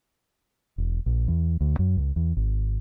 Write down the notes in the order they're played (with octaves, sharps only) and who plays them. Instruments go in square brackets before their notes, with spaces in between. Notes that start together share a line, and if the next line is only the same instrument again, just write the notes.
[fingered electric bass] E1
A#1
E2
D2
F#2
C#2
E2
G#1